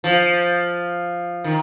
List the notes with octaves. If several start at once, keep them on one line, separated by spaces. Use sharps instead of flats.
F3
D#3